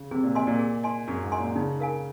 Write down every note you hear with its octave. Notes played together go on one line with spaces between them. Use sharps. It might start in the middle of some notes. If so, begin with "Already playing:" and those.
Already playing: C#3
C3 G#4
A#2
C3 D#5 G#5 C6
A#2
G#4
D#5 G#5 C6
F#2 G#4
G#2
D#5 G#5 C6
A#2
C#3 D#4
A#4 F5 G#5